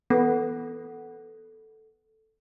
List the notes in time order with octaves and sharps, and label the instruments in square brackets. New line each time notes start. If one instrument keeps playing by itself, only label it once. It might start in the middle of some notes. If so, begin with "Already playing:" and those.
[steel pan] B3 [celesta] A4